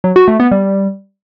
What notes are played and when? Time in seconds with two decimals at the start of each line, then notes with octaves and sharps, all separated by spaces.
0.04 F#3
0.16 F#4
0.28 A3
0.40 B3
0.51 G3